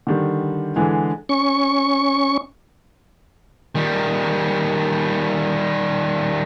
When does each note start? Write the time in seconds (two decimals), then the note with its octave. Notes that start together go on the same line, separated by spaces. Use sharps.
0.07 D3 D#3 G3
0.76 D3 E3 G#3
1.29 C#4 C#6
3.75 D#3 G3